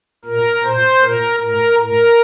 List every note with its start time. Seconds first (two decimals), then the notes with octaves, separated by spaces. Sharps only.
0.25 A#2 A#4
0.63 A#2 C5
1.02 A#2 A#4
1.40 A2 A#4
1.78 A2 A#4